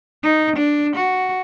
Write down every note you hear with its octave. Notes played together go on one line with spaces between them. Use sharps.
D#4
D4
F#4